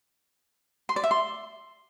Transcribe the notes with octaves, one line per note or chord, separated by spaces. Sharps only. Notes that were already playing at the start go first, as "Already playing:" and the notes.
C6
D5
E5
C6